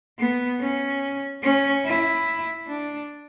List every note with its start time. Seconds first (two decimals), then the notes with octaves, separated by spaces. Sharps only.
0.19 B3
0.60 C#4
1.43 C#4
1.85 E4
2.68 D4